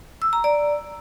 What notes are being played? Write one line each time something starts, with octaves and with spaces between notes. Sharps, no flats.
E6
A#5
D5